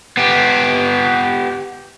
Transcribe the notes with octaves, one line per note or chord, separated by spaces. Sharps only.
B3 G4